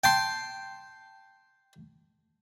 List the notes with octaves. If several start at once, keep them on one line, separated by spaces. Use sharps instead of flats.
G5 A5 C6